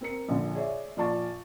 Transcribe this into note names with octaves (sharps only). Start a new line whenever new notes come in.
C4 A#4 C#7
A#1 D3
G#4 C#5 D5 E5
A#1 F4 D5 A5 C#6 A6